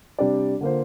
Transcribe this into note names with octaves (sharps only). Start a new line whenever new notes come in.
C3 G3 D4 G4 D5
D3 A#3 F4 C5